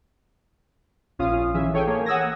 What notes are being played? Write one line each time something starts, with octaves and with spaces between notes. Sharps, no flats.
A#1 C#4 F4 F5 D#6
A#1 E3 C#4 G#4 E5
A4 C#5 G5 G#5
A#3 G#4 C#5
F#5 D#6 E6 G#6 A#6